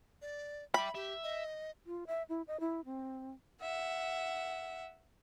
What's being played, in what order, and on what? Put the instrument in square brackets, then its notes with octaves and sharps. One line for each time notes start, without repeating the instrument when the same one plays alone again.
[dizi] D5
[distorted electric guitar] D5 G5 [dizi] E5 [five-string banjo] B5
[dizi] G4 [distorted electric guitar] E5
[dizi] D#5
[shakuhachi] F4
E5
E4
D#5
E4
C4
[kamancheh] E5 F#5